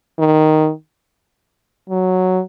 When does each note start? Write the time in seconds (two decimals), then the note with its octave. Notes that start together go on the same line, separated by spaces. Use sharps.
0.19 D#3
1.90 F#3